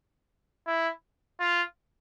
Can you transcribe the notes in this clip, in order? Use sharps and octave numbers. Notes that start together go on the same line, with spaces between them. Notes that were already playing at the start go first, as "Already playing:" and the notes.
E4
F4